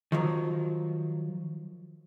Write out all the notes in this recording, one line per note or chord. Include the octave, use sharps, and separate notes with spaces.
D#3 F3 F#3